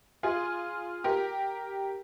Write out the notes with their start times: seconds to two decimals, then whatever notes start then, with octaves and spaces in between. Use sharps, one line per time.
0.23 F4 G#4
1.04 G4 A#4